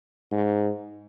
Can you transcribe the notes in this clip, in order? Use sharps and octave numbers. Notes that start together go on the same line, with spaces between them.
G#2